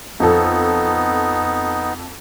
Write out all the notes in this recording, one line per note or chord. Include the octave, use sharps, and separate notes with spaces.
F2 B3 D#4 A4